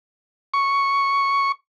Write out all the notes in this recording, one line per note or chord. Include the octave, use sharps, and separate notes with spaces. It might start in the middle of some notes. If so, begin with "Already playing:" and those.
C#6